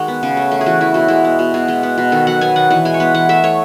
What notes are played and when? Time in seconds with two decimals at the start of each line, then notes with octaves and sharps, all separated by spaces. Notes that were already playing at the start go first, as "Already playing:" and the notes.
Already playing: D#3 G#3 F#4
0.08 B3
0.23 C#3
0.37 A3
0.52 A3
0.61 G#4
0.66 E3 F#4
0.81 E3 E4
0.94 B2 F#4
1.08 G#3 E4
1.25 B3
1.39 B2
1.54 B2 G#4
1.68 G#3
1.83 B3
1.98 B2
2.12 D#3 A4
2.27 F#3 F#5
2.41 B3 G#5
2.56 D#3 F#5
2.71 E3 F#5
2.85 G#3 G#5
2.94 C#5
3.00 B3 B4
3.14 E3 F#5
3.29 A3 E5
3.44 A3 C#5